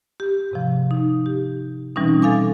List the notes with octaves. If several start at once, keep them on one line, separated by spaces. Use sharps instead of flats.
G4
G#2 C3 F3
D#4
G4
B2 E3 G3 C4 C#4 D#4
A4 F5 G#5 D6